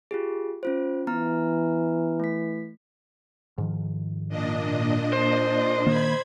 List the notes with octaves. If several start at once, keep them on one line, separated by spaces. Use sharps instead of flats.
F4 G4 G#4
C#4 F4 C5
E3 B3 A#5 F6
A3 B6
G#2 D#3 F3
A#2 D4 D#5
C5
D#3 A#3 B5 G#6